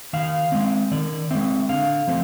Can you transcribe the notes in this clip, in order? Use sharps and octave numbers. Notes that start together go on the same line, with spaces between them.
D#3 F5
G#3 C4
D#3 D5
G#3 C4 E5
D3 F5
F3 A3 C4